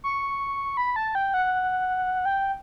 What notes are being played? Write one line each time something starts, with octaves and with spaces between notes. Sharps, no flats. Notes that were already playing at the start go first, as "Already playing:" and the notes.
C#6
B5
A5
G5
F#5
G5